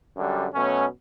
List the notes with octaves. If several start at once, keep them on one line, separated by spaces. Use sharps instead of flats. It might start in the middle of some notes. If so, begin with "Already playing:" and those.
F#2 D3 G3
B2 F#3 A3 C#4